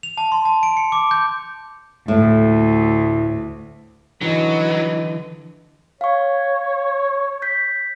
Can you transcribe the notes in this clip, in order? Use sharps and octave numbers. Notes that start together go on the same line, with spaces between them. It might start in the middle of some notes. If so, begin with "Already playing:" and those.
F7
A5
C6
A5
D7
C#7
D6
G6
D2 A2
D3 E3 F#3 B4 D#5
C#5 F5 C#6
G6 B6